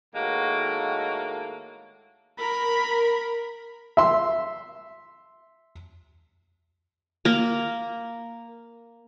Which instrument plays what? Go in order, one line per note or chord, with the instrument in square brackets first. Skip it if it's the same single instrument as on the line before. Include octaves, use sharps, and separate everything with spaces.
[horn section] A2 D#3 G#3 A#3 F#4 A4
[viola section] A#4 [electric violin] B5
[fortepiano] E5 C6
[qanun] A#3 A#4